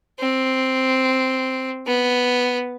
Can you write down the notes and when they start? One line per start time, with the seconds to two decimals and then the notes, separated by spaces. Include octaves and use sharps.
0.20 C4
1.86 B3